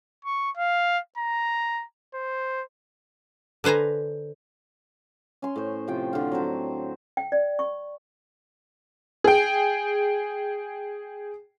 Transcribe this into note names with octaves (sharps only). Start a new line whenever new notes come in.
C#6
F5
A#5
C5
D3 B4 C5 G#5 A#5
C#4 C6
A2 C5
C3 F3 G5
D3 F4
F#3 C4 C5
G5
D5
C#6
G#4 G5